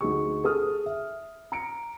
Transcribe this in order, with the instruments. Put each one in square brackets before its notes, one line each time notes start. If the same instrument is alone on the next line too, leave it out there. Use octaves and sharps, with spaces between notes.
[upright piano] D2 D#4 G#4 C#6
G#4 A4 D#6 F6
E5
A#5 C#7 D7